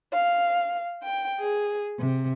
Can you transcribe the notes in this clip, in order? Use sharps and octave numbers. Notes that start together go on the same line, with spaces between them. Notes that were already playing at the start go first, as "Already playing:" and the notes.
F5
G5
G#4
C3